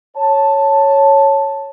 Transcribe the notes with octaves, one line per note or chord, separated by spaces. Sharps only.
C#5 A5